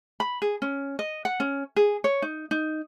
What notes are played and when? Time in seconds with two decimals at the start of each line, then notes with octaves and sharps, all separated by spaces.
0.20 B5
0.42 G#4
0.62 C#4
0.99 D#5
1.25 F#5
1.40 C#4
1.76 G#4
2.04 C#5
2.22 D#4
2.51 D#4